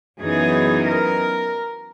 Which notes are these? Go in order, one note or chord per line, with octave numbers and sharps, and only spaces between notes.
F#2 E3 B3 D#4 G#4
A#4